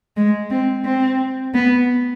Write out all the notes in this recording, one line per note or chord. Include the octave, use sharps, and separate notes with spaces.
G#3
C4
C4
B3